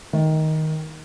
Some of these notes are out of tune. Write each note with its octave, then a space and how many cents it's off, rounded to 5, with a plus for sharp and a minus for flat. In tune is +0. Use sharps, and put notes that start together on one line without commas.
D#3 +10